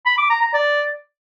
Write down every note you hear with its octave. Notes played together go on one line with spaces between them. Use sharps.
B5
D6
A#5
A#5
D5